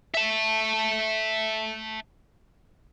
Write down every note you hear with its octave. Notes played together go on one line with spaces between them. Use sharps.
E5 A5